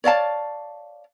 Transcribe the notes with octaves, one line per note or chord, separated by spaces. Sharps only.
C#5 D5 F5 A5